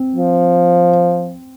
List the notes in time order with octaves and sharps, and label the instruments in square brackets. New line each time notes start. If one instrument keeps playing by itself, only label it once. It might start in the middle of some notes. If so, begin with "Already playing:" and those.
Already playing: [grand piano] C4
[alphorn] F3